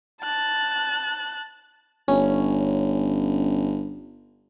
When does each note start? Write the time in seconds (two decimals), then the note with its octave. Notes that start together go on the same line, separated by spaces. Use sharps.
0.22 A5 F#6
2.08 G1 C#4